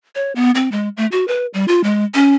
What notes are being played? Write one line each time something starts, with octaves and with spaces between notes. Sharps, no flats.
C#5
B3
C4
G#3
A3
F#4
B4
G3
F4
G#3
C#4